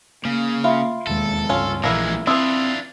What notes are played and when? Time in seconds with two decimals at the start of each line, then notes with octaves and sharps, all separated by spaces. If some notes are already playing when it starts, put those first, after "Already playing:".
0.25 C#3 A#3
0.64 F4 E5 F5 B5
1.07 E1 D#2 G#3 A4
1.49 C#2 G2 C3 C#4 F4
1.84 A#1 A#2 E3 G#3 A#3 E4 B4 A#6
2.27 C4 D4 E4 F4 B4 C6 D#6 E6